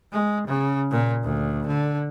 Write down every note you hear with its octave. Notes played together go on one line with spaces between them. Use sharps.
G#3
C#3
A#2
D2
D3